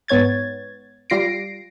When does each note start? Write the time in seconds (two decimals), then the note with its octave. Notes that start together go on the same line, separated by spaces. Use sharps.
0.08 G#2 B3 C#5 G#6 A6
1.10 G3 F4 A#6 C7 D7